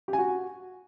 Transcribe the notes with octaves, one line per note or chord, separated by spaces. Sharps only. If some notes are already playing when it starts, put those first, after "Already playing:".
G4
G#5
F#4